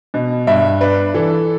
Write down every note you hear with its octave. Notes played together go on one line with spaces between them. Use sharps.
B2
G2 E5
D4 B4
E3 A4